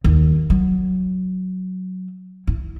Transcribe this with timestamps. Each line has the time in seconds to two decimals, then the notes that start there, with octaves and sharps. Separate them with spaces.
0.04 D#2
0.50 F#3
2.47 E4